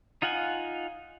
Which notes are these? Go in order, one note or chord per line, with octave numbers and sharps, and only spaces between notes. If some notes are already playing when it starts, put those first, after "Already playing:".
D#4 F4 F5 F#5 G#5